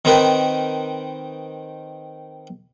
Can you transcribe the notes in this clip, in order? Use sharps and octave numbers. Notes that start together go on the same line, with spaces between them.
D#3 C4 D#4 A#4 B4